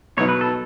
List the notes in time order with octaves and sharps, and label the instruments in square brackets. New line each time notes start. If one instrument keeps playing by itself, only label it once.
[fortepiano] B2 F#3 B3 D#4 [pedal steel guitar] C#5
[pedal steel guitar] B4
A4